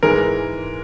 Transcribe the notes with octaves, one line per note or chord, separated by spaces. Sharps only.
G#2 E3 G#3 A#4